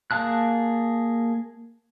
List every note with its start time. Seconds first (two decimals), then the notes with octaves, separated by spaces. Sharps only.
0.11 A#3 G#4 F5 A5 F#6